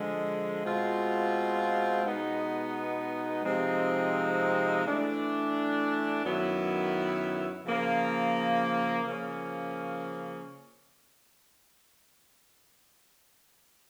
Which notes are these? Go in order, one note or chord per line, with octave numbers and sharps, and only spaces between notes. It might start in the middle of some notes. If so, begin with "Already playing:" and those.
Already playing: D3 F3 G#3
B2 G#3 C4 F4
B2 G#3 B3 D#4
C3 F3 G#3 C4 D#4
E3 A3 D4
F#2 D#3 F#3 B3 E4
C#3 F3 A#3
C#3 F3 A#3 C#4